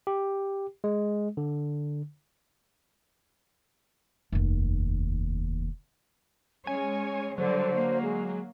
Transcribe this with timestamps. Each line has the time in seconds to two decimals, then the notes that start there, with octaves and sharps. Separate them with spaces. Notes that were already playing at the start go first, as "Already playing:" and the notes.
0.07 G4
0.84 G#3
1.37 D3
4.32 F1 D#2
6.67 G#3 C#4 C#5 G#5
7.38 D3 F#3 G3 C5
7.73 A#3
8.02 G#3